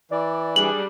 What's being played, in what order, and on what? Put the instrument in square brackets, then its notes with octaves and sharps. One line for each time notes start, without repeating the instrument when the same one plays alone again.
[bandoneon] E3 [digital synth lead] D5
[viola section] G3 D4 [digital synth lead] G#4 [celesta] F#7